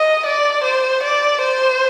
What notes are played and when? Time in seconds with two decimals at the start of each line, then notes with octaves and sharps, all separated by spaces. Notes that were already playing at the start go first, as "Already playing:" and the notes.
Already playing: D#5
0.26 D5
0.64 C5
1.03 D5
1.42 C5